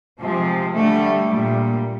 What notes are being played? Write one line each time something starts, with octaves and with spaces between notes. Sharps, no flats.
C3 F3 G#3
D3 G3 A3
A#2 G3